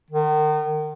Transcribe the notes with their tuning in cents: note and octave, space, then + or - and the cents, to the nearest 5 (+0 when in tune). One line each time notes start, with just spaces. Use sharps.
D#3 -35